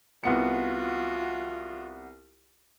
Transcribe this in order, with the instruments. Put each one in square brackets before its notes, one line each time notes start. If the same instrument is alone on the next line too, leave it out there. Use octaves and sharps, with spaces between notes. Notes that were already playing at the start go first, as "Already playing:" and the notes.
[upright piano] C2 B3 C#7 [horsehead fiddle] F4 F#4